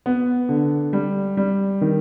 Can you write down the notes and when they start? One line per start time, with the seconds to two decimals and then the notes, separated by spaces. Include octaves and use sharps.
0.06 B3
0.49 D3
0.93 G3
1.37 G3
1.81 D#3